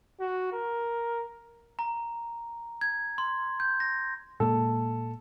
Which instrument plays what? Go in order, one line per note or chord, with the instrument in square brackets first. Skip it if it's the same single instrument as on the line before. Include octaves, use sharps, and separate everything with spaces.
[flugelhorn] F#4
A#4
[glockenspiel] A#5
G#6
C6
G6
A#6
[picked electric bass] A#2 G#3 A#3 [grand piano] A4